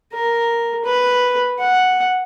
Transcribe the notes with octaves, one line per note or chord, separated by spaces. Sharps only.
A#4
B4
F#5